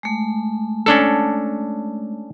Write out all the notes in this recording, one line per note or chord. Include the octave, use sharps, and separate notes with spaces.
G#3 A3
C#4 D4 A4